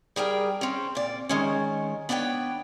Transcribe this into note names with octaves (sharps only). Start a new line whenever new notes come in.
G3 G#4 A#4 G5
C4 C#4
A#2 D5
D#3 G#3 C#4
B3 D4 B4 C#5 G5